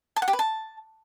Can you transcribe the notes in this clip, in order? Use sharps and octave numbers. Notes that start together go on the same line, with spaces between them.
A5
F#5
G4
B4
A5